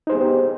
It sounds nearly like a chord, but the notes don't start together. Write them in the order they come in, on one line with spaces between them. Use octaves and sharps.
D#4 C5 G#4 B3 G4